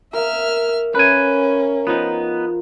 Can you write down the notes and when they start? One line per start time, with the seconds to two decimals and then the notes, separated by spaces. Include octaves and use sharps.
0.13 A#3 A#4 E5 F6
0.95 C#4 A#4 B4 E5 G#5
1.87 F3 B3 D#4